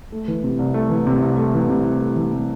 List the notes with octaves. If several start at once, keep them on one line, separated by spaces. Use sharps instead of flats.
A3
E3
C3
C2
A3
E3
C3
C2
A3
E3
C3
C2
A3
E3
C3